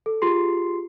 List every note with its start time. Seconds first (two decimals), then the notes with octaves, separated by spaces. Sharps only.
0.06 A4
0.22 F4 G4 G#4 C6 C7